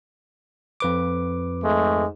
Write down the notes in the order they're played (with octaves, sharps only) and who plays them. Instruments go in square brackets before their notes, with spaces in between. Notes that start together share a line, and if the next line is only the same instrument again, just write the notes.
[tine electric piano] F2 B4 D6
[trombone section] G#2 G#3 A3